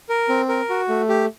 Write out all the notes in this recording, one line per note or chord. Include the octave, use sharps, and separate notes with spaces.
A#4
C4
A#4
F#4
A3
G4